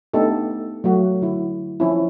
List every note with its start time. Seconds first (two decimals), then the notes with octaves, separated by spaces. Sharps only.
0.14 A3 B3 D4 D#4 G4 A4
0.84 F#3 A3 F#4
1.22 D3 E4
1.80 F3 C#4 E4